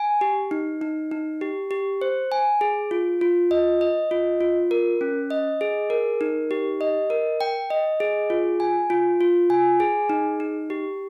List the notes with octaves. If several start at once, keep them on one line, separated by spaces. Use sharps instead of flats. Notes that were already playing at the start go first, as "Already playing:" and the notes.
Already playing: G#5
G4
D#4
D#4
D#4
G4
G4
C5
G#5
G#4
F4
F4
D#5
D#5
F4
F4
A#4
C#4
D#5
G#4
A#4
D#4
G4
D#5
A#4
G5
D#5
G#4
F4
G#5
F4
F4
G#5
G#4
D#4
D#4
G4